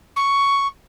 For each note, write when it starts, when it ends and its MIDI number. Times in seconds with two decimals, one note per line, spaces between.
0.16 0.68 85